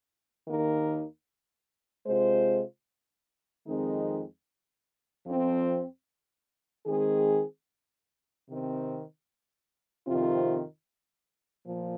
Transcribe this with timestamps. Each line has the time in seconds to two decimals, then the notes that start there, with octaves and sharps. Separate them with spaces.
0.47 D#2 D#3 A#3 D#4 A#4
2.06 C3 G#3 F4 C5
3.67 F2 D#3 G#3 C4 D#4
5.26 F2 F3 C4
6.86 D#3 G#3 C4 G#4
8.46 C3 D#3 C4
10.06 F2 C3 D#3 C4 F4
11.66 A#2 F3